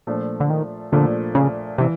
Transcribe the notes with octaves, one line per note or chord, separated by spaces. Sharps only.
A#2 F3 A3 D4
D3
D#3
A#2 D3 F3 A3 D4
C#3
C3 E3